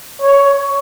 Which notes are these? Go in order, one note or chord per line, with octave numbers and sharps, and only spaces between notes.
C#5